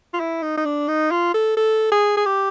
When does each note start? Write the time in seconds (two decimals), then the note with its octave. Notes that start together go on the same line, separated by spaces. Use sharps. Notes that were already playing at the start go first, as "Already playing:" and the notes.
0.14 F4
0.20 E4
0.43 D#4
0.57 D#4
0.65 D4
0.88 D#4
1.11 F4
1.34 A4
1.57 A4
1.92 G#4
2.17 G#4
2.26 G4